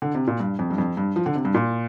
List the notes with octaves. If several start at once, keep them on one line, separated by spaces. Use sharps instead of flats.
D3
C3
A#2
G2
F2
G2
F2
G2
F3
D3
C3
G2
A#2